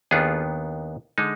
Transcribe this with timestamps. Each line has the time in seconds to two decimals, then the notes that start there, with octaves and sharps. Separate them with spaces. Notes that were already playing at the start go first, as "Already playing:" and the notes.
0.11 D#2 D#3 B3 D4 F4 G#4
1.18 D3 G#3 D#4